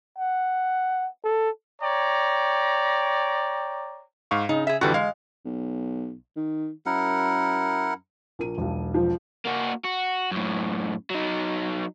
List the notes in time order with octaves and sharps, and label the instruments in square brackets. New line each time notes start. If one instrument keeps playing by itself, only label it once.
[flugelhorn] F#5
A4
[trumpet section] C#5 D5 G5 A#5
[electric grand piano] G#2 F5 C#6
[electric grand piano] C#3 [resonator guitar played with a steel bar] D#4
[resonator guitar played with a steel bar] G#4 E5
[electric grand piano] F2 D3 E3 [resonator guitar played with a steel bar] G3 F#4
[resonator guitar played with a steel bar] G#3 [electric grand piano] F5
[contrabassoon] B1
D#3
[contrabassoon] F#2 [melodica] E4 A#4 F#5
[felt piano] A#1 A#4 D#7
E1 B1
[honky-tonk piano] F3
[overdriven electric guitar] A#3 F#4
F#4
F#2 A2
F#3 D#4